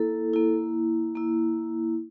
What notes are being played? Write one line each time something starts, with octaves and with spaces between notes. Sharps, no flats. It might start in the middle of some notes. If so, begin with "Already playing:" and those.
Already playing: A#3 E4 A4
A#3 E4
A#3 E4